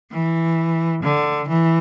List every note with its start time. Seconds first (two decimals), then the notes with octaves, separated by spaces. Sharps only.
0.12 E3
1.03 D3
1.48 E3